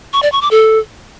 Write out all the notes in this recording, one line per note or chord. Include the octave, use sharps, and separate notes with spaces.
C#6
D5
C#6
D6
A4